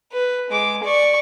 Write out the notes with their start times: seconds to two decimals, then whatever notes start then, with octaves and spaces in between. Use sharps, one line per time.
0.12 B4
0.50 G#3 D6
0.83 D5 C#6